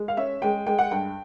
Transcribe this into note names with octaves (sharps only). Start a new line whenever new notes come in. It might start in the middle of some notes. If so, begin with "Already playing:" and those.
Already playing: G#3
F5
C#4 E5
G#3 G5
G#3 G5
F#5
G2 G5